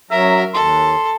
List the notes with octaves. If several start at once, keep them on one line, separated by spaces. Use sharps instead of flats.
F#2 F#3 A#4 E5 A#5
D#2 A4 C6